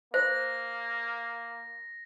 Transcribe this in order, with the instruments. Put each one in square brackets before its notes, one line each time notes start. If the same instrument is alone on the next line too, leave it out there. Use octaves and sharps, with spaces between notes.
[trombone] A#3 [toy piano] C5 [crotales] A#6